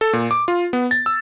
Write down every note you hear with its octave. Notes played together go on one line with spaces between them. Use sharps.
A4
A#2
D6
F4
B3
A6
E6